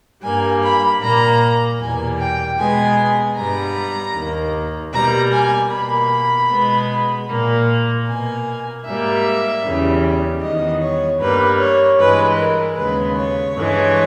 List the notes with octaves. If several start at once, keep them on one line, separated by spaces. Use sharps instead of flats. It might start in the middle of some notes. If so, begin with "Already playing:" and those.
G2 G3 A#3 G#5
B5
A#2 A#3 A#5
E2 B2 G3 A#3 G#5
G5
B2 G#3 B3 G#5
G2 G3 B3 A#5
D#2 D#3 A#3
B2 G3 A#3 A#5
G#5
B2 A#3 B5
B2 G#3 B3
A#2 A#3
B2 A#3 G#5
G#2 G3 A#3 E5
E2 C#3 G3
E2 D#3 G3 B3 D#5
C#5
G2 G3 A#3 B4
C#5
G2 E3 G#3 B4
A#4
D#2 C#3 G#3 B3 B4
C#5
G2 E3 G#3